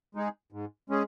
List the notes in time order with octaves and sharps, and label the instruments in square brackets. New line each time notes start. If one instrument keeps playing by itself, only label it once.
[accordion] G#3 D#4 G#4
G#2
G#3 C#4 G#4